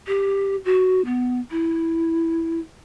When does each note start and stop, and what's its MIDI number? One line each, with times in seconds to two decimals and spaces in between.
0.07 0.56 67
0.65 1.01 66
1.05 1.40 59
1.51 2.59 64